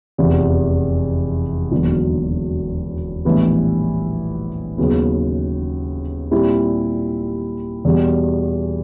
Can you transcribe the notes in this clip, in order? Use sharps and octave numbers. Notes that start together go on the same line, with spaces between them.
F1 E2 C3 F3
E1 D#2 D3 F#3 B3
A#1 A2 E3 G3 B3
D#2 C#3 F#3 B3
A#2 G3 C4 E4 G4
E2 B2 G3